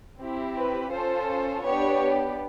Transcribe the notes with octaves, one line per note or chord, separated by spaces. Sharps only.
C4 E4 G4
B4
C#4 F4 A4 C5
B3 D4 G4 C#5